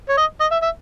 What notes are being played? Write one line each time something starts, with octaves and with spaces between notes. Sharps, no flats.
C#5
D#5
D#5
E5
E5